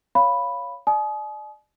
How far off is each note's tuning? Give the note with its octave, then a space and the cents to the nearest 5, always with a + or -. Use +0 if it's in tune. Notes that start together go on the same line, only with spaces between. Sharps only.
C#5 +5 F5 +0 B5 +0
D5 +35 G#5 +45 D#6 +0